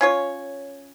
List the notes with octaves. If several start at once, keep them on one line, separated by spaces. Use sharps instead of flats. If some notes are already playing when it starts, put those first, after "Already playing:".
C#4 F4 C#5